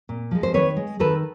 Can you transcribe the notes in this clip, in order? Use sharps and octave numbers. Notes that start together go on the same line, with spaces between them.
A#2
F3 G#3
C5
D#3 B4 C#5
G#3
D#3 A4 B4